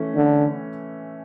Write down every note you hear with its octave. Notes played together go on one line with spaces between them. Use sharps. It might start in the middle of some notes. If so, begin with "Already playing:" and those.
Already playing: E3 A3 C#4
D3